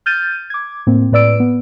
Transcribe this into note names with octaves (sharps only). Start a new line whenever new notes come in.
F6 G6 A6 D#7
D6 G#6
A2 A#3 C4
A2 B4 D5 E6 D7
B3